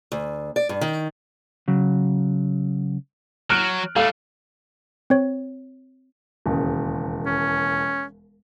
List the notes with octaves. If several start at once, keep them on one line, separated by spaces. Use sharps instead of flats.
D2
D5
G2
D#3
C#3 F#3
F#3 F6 F#6 D7
G3 A3 A4 F5
C4 C#5
E1 D#2 C#3
C#4